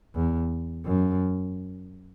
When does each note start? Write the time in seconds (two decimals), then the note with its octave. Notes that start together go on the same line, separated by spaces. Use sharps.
0.16 E2
0.85 F#2